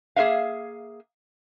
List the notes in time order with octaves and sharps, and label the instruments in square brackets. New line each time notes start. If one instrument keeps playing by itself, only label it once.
[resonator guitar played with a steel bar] A#3 G#4 B4 E5 F5